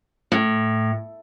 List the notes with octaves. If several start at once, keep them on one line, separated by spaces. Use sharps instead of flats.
A2